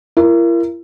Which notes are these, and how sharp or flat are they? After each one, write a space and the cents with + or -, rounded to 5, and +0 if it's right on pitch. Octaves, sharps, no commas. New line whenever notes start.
E4 +45 A#4 +0